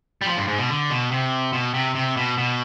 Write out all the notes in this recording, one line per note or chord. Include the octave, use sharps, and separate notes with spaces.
G3
F3
G2
G#2
B2
D3
B2
C3
B2
C3
C3
B2
B2